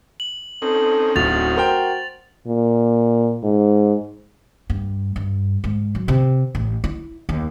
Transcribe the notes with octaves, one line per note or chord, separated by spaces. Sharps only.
F#7
C4 C#4 D#4 A4
D1 F#4 A6 F7
A#4 C5 G5
A#2
G#2
G2
G2
G#2
F#3
C3
A1
E4
D#2